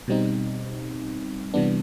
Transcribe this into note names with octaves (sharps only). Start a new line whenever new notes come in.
B2 G3 C4 D#4
C3 E3 G3 B3 D4